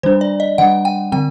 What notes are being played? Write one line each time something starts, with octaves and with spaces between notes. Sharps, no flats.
D#3 G3 D4 C5
D5
D#5
D#3 G3 D4 F#5
G5
D3 F#3 C4 G5